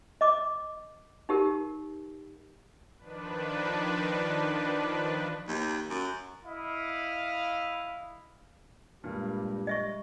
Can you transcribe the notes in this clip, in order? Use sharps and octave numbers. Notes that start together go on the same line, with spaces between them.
D#5 D6
D#4 G4 A#4
D#3 F3 D4 B4
D#2
F#2
E4 D#5 F5
G2 A#2 G3 G#3
D#5 E5 C#6